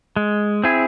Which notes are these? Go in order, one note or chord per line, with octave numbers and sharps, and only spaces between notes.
G#3
C4 E4 G#4